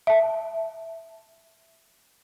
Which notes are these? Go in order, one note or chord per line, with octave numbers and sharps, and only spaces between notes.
E5 A5